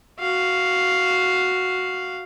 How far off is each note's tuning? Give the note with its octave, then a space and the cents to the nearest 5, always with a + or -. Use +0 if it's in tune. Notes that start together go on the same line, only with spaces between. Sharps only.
F#4 +0 F5 +0